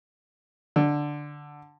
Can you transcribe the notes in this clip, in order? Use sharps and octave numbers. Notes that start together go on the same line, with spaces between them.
D3